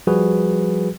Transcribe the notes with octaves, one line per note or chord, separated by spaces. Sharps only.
F3 G3 F#4 G#4 B4